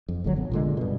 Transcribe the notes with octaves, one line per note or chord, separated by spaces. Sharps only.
F2
F1 B1 D3 F#3
G1 B3
A#2 D3 G#3
G2 B2